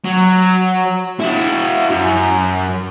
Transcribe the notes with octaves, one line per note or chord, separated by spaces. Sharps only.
F#3
E4 F#4
F#2